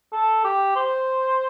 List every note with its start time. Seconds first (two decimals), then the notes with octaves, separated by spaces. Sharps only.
0.13 A4
0.44 G4
0.76 C5